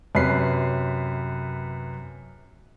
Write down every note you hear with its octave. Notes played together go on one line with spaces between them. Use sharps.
F#2 C3 B4 C#5 B5 C7